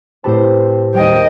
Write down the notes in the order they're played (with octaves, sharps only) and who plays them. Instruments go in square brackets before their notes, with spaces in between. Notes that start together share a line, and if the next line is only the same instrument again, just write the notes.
[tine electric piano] A2 G4 A5 [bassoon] C4 [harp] B4 C5
[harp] D#2 G3 [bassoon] C3 [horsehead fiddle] D#5 G5